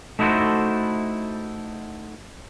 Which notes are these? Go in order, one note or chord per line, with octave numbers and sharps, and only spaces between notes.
A3 D#4 E4 F#4 A4 C5